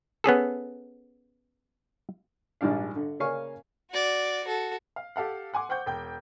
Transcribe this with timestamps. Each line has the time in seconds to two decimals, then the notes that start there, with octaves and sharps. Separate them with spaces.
0.24 B3 C#4 G#4 A4
2.61 A#1 G#2 G3 D4 F5
2.96 D3
3.20 C#3 A#3 C#4 F5 G#5 C#6
3.91 F#4 D5
4.44 F#4 A4
4.96 F5
5.16 G4 A4 F5 F#5
5.54 F#5 G#5 C6 D6
5.69 C5 F#5 G5 C#6 G6
5.86 E1 G5 G6